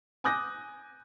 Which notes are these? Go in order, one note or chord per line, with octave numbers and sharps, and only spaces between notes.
G#5 D6 D#6 F#6 G6 A#6